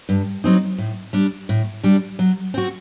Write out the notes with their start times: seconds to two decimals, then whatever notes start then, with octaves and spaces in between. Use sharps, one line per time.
0.09 G2
0.44 F#3 C4 D#4
0.78 A2
1.13 G3 D4
1.49 A2
1.83 G3 D4
2.19 F#3
2.54 C4 F#4